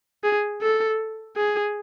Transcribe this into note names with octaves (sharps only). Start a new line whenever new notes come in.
G#4
A4
G#4